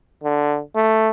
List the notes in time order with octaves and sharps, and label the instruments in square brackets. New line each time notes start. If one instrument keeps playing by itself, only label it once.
[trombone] D3
A3